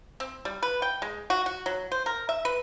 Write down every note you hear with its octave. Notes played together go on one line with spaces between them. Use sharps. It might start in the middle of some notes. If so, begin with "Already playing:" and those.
C4
G3
B4
G5
G#3
F#4
F#4
F#3
C5
A#4
E5
B4